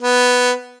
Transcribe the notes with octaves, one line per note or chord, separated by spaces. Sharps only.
B3